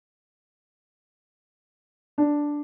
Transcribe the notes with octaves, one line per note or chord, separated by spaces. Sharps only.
D4